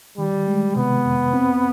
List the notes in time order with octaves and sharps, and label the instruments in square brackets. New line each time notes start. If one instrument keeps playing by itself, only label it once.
[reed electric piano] D#3 [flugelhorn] G3
[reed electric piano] G#3
[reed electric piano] C3 [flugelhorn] B3
[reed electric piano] F2
C4